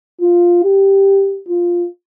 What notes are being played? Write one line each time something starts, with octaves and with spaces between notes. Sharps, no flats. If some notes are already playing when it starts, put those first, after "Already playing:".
F4
G4
F4